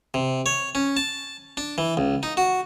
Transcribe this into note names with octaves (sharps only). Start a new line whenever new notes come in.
C3
C#5
C#4
A5
D4
E3
C#2
D#4
F#4